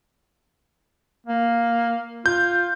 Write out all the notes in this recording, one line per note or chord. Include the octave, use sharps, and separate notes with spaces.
A#3
F4 G6